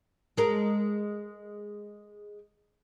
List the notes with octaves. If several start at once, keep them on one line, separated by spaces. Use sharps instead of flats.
G#3 A#4